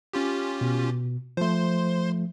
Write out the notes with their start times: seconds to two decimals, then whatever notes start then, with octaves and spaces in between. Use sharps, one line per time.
0.13 C#4 F4 G4
0.61 B2
1.37 F3 A3 C5 C6